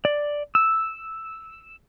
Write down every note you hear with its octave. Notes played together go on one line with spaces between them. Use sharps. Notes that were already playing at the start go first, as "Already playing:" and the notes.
D5
E6